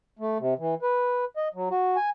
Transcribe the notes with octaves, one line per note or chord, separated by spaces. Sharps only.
A3
C3
E3
B4
D#5
F#3
F#4
G#5